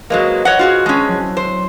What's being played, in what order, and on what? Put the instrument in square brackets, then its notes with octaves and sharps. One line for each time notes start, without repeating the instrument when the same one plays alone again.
[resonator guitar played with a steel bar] F#3 G#3 A#3 [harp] B4 C5 D#5
[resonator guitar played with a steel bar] C#5 D#5 F#5 [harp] B5
[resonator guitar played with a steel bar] F4 F#4 G#4
[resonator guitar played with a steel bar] G#3 C#4 [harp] A5 E6
[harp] F#3 C4 E4
[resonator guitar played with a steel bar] C5